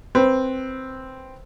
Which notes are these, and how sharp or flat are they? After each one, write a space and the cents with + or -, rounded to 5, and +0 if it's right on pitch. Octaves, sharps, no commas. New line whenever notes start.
C4 +0 B4 +0